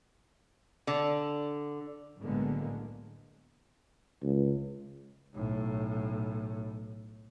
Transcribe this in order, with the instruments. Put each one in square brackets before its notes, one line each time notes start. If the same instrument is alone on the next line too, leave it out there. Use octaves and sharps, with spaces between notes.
[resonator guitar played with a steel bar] D3
[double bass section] B1 A2 D3 G#3 A#3 B3
[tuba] C#2
[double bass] B1 A2